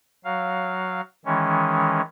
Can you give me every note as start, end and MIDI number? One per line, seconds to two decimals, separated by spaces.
0.25 1.01 54
0.25 1.01 77
1.25 2.01 51
1.25 2.01 52
1.25 2.01 56
1.25 2.01 61